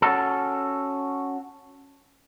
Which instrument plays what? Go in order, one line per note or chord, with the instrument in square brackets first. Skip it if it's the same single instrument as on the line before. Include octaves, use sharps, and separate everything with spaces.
[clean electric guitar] C#4 F#4 A4